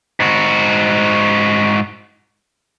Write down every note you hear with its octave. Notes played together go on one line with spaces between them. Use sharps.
G#2 F#4